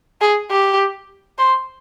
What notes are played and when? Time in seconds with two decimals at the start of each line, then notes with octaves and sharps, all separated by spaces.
0.21 G#4
0.50 G4
1.39 C5